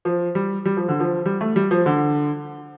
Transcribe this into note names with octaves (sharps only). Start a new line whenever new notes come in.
F3
G3
G3
F3
D3
F3
G3
A3
G3
F3
D3